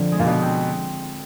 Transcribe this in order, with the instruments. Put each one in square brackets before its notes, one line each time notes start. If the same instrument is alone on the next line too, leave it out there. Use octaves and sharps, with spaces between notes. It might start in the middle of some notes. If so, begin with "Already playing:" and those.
Already playing: [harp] D3 F3 C4
G#3
[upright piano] A#2
B2
[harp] C4